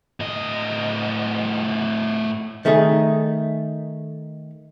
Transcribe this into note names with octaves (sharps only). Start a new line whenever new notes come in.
A2 D#5
D#3 A3 D#4 G#4